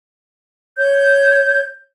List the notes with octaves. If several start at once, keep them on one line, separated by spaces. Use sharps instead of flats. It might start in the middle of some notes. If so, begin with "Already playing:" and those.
C#5 G6